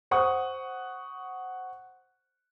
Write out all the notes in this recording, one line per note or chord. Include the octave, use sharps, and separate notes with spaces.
C5 F#5 C#6 D#6